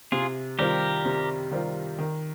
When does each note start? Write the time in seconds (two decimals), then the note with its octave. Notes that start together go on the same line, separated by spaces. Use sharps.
0.12 C3 F4 G#4
0.59 D#3 G3 C4 F4 G4 A#4
1.05 C3
1.51 D#3 G3 C4 F4
1.99 D#3